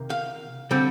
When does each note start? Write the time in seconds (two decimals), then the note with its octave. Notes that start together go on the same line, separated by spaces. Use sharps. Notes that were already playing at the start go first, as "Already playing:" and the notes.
Already playing: C3 D#3 A#3
0.10 F5
0.71 D3 G3 C4